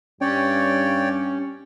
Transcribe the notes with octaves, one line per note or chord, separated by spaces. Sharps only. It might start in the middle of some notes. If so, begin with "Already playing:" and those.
G2 C#4 C#5 D5 G5